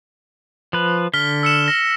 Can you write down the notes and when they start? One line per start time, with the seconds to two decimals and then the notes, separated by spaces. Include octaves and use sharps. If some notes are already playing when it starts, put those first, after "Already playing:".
0.73 F3 B4
1.14 D3 F6 B6 G7
1.43 E6 C#7 E7
1.68 A#6